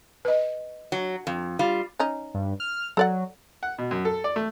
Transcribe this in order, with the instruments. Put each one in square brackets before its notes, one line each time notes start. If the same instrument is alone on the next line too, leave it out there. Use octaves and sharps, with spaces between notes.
[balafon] B4 D#5
[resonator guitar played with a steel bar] F#3
F2
G3 F4
[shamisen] C#4 D#4
[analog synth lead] G2
F6
[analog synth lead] F#3 [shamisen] A4 D5 F#5
[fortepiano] F#5
B2
F#2
A4
D5
A3